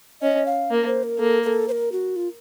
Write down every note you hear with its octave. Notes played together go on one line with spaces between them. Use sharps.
C#4 D#5
F5
A#3
C5
A#4
A#3 A4
A#4
A4
C5
A#4
F#4
F4